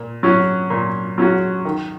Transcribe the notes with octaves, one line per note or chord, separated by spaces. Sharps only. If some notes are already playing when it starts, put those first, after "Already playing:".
Already playing: A#2
F#3 C#4 F#4
A#2
F#3 C#4 F#4
D#3